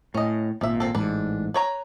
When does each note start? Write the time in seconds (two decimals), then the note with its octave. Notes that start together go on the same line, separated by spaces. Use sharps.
0.14 A2 C#4 D#5
0.61 G#1 A#2 F3 E5
0.80 C4 A4
0.95 A1 G#2 D4 B4
1.54 B4 C#5 A#5